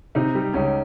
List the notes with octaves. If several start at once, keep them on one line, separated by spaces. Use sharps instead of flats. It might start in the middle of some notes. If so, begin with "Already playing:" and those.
C3 D#4
G3
C#2 C#4